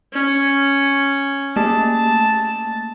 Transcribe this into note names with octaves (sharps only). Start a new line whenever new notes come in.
C#4
A3 A#3 A5